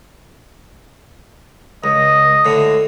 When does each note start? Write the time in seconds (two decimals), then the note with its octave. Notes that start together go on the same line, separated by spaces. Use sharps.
1.84 C#2 D#5
2.45 A2 D3